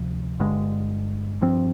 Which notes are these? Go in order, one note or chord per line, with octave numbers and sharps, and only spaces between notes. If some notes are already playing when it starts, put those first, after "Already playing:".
Already playing: D2 C3 F3
G1 G2 D3 G#3
G2 F3 C4